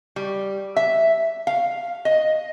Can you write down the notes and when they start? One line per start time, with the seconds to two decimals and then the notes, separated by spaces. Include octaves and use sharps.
0.16 G3
0.76 E5
1.47 F5
2.05 D#5